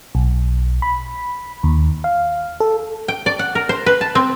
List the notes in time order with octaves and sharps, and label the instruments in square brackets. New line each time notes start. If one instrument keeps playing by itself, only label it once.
[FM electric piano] B1
B5
D#2
F5
A4
[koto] G5
D5
F#5
A#4
C5
B4
A5
C4